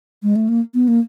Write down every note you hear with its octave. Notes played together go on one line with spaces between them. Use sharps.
G#3
A3
A#3
B3
A#3